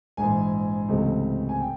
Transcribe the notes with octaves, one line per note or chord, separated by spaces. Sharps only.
A#1 G#2 E3 G#5
C#2 C3 E3 A3
G#5
G5